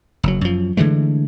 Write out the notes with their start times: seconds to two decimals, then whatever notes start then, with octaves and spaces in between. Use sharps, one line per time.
0.23 F#1 F#3
0.41 F#2 F3
0.77 D3 E3 G#3 A3